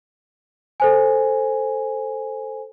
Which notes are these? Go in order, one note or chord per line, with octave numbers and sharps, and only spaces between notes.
A4 C5 G#5